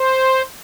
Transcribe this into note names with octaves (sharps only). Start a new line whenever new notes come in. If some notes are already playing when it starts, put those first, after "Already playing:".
Already playing: C5